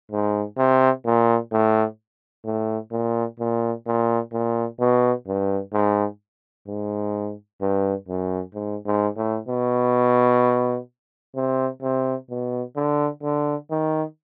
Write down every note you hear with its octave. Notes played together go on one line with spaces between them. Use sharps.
G#2
C3
A#2
A2
A2
A#2
A#2
A#2
A#2
B2
G2
G#2
G#2
G2
F#2
G#2
G#2
A2
B2
C3
C3
B2
D3
D3
D#3